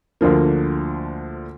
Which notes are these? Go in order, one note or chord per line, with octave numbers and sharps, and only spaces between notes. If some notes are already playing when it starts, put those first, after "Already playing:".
D2 D3 F3 A#3